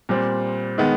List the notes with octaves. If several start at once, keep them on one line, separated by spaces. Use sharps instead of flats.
A#2 G3 C4
D#3 G#3 B3